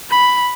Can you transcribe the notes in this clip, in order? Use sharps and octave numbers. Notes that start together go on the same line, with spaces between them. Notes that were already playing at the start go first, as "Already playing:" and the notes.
B5